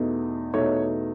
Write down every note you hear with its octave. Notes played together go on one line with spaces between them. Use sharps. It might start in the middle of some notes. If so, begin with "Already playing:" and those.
Already playing: E2 B2 A3 D#4
E2 B2 A3 D#4 C#5